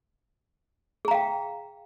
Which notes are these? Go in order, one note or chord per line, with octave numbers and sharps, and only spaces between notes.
G#4 F5 G5 A#5